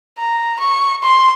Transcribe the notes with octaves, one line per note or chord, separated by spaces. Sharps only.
A#5
C#6
C6